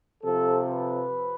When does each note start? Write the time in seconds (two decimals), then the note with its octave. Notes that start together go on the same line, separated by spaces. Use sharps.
0.24 C3 F3 A4
0.72 B4